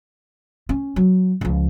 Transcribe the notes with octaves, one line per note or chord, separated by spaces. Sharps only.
C#4
F#3
C#2 F3